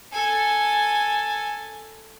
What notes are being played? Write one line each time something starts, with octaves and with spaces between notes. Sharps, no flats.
A4 G#5